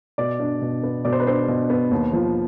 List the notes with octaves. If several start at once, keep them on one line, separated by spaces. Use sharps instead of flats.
B2 D5
D4
B2
B3
B2 D5
C5
B4
D4 C5
B2
B3
D#2
F3